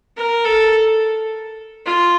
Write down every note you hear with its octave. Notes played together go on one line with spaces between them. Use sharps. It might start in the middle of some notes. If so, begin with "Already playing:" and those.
A#4
A4
F4